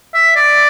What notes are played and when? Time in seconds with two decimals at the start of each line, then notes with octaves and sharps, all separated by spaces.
0.14 E5
0.36 D5